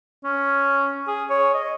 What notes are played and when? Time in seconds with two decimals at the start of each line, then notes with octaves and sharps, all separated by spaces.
0.24 C#4
1.07 G#4
1.30 C#5
1.54 D#5